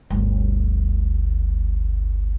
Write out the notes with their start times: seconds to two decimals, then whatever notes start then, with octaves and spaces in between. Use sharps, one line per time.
0.10 G1 D2